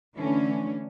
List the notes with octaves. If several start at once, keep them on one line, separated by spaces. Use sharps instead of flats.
D3 E3 A3 C#4 D4